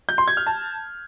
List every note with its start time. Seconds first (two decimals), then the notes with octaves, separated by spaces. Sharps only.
0.09 G6
0.18 C6
0.28 G#6
0.37 F6
0.47 A5